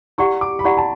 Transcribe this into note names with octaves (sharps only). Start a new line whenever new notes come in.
E4 G4 D5 F#5 C#6
D6
B5
E4 G4 D5 F#5 C#6
A5